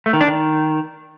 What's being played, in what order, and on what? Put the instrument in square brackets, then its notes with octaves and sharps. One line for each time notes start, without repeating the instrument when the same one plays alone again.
[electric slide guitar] A3
D#3
D4
D#3